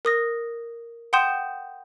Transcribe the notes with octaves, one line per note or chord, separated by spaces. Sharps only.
A#4 D#6 A#6
F#5 G5 C6 D#6 G6 E7